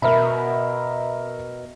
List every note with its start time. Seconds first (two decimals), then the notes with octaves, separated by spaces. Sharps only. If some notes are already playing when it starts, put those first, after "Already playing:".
0.02 B2 A#4 E5 B5